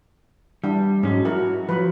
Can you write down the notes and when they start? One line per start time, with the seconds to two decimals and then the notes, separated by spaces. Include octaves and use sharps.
0.64 E3 G3 D4
1.03 G#2 F#3 G#3 C#4
1.25 E4 F#4 A#4
1.69 F3 F#3 B4